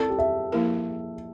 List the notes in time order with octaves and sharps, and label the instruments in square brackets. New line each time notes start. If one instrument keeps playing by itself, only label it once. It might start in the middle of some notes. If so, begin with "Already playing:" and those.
Already playing: [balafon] C4 E4 A#4 D5 [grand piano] A4
[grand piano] G4
E5
[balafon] F3 A#3 E4 A#4